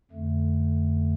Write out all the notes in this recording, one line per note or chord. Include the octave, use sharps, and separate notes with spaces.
F2 D3 A3